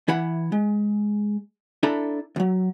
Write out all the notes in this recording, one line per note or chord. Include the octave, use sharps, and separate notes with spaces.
E3 E4 F#5 B5
G#3
D4 E4 A4 A#5 B5
D2 F#3